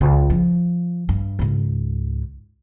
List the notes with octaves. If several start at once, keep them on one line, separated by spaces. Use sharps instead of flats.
C#2
F3
G2
C#2 G#2